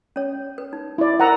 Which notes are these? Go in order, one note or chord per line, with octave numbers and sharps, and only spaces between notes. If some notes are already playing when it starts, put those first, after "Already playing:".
C#4 C#5
B4
D#4
E4 D5
A#4 C5 F#5 A#5